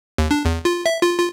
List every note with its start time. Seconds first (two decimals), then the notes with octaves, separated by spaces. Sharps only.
0.18 D#2
0.31 D4
0.45 E2
0.65 F4
0.86 E5
1.02 F4
1.18 F4